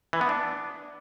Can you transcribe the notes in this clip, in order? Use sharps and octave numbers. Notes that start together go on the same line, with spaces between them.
E3
B3
D4